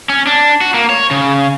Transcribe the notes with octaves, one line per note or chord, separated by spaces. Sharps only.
C#4
D4
F#4
A#3
C#5
C#3